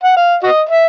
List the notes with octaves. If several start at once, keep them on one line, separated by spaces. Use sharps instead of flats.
F#5
F5
F#4 D#5
E5